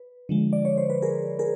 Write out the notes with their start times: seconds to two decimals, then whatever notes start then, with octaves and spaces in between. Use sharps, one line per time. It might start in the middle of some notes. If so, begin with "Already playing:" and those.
Already playing: B4
0.29 D3 F3 G#3
0.53 D5
0.65 C#5
0.78 C5
0.90 B4
1.02 G#4 A#4
1.39 G#4 A#4